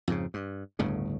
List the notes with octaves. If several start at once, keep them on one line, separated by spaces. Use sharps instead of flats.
F2 G#2 C#3
G2
G1 D2 A2 C#3